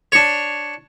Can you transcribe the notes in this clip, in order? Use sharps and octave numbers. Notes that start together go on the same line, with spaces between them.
D4 C#5